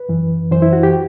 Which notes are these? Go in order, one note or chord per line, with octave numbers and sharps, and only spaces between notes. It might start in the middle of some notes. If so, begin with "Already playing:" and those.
Already playing: B4
F#2 E3
F#2 E3 C5
E4
F#4
G4